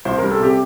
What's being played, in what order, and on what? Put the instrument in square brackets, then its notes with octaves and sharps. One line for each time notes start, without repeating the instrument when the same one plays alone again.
[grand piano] C2 C5
G3 A#4
A4
C3 G4